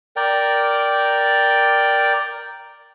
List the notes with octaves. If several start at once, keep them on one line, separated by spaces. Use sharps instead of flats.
A#4 D5 G5